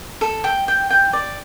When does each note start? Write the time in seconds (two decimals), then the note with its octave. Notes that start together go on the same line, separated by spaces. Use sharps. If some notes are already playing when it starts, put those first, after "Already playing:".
0.21 A4
0.44 G5
0.68 G5
0.90 G5
1.13 D5